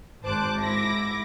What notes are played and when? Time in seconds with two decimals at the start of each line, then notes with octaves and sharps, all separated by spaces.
0.22 G#1 C5 A5 D6 F#6
0.58 G#2 E4 D6 A#6